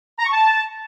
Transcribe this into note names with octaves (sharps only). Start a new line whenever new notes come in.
A#5
C#6
A5